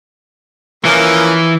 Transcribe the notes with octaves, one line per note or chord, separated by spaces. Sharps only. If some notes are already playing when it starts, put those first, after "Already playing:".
E3 F3 A#3 C#4